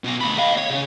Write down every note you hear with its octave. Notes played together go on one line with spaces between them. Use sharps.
B2 A#5
D2 B5
D#5 F5
C#5
C#3